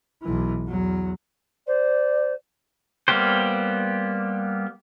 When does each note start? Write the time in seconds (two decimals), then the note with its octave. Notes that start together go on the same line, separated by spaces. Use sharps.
0.23 B1 E3
0.68 E2 F#3
1.67 C5 D5
3.08 G3 A#3 B3 G4 C5